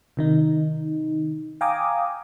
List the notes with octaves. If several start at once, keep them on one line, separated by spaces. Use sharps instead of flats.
C3 D#3 D#4
F5 G5 G#5 A#5 D6 D#6